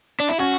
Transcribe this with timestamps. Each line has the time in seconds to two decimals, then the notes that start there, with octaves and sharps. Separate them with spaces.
0.20 D4
0.29 E4
0.40 C#4 F#4